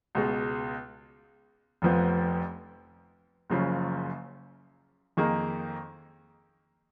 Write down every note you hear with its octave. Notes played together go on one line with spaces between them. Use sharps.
C#2 B2 G#3
F1 F2 F3 B3
F#1 F#2 C#3 F3
F2 D#3 A#3 D#4 G#4